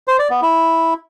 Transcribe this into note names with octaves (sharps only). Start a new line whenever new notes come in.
C5
D5
B3
E4